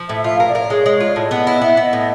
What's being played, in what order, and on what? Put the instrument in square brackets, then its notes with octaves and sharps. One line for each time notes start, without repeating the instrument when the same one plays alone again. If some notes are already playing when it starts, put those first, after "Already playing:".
Already playing: [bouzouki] F3
[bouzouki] A2 [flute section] E5
[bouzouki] F4 [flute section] E5
[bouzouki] A#4 [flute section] F5
[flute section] D5
[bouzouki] A#4 [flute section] C#5
[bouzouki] G#3 [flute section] C#5
[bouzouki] G#3
F4
[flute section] D5
[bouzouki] A2 [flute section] D#5
[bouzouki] B3
[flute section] D#5
[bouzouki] E4
[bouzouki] B3 [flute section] E5
[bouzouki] B3
[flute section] D#5
[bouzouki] A2